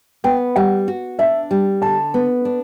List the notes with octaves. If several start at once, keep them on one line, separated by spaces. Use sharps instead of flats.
B3 G5
G3 F#5
F#4
D4 E5
G3
D3 A5
B3
D4